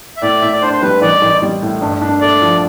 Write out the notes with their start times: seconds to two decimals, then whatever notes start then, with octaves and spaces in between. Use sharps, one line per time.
0.17 E5
0.22 A2 D5
0.41 A2 E5
0.52 D5
0.61 D4 C5
0.73 C5
0.82 G3 B4
1.02 A1 D5
1.22 A1
1.42 G3
1.62 A2
1.82 G2
2.02 D4
2.21 A3 D5
2.42 F3